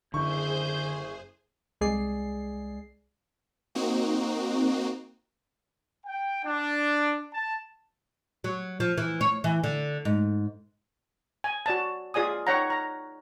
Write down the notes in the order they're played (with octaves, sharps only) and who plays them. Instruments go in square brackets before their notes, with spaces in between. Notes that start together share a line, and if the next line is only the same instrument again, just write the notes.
[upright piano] F#1 E4 C#6 [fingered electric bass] D3 [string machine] G#4 C5 [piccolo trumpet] G6
[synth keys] C2 G#3 G#4 D5 C7
[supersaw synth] A#3 C4 D#4 F#4
[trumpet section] G5
D4
A5
[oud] F#3
F3
E3
C#5
E3
D3
G#2
[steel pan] G#5
F#4 D5 A5
F4 G#4 D5 G#5 D#6
D#4 C#5 F#5 G5 A#5
A#5